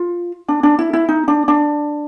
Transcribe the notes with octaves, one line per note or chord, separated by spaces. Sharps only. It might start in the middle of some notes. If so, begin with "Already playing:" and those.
Already playing: F4
D4
D4
E4
E4
D#4
D4
D4